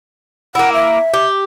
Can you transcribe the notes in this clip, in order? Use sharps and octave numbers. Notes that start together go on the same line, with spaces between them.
A#3 E4 F#5
E5
G4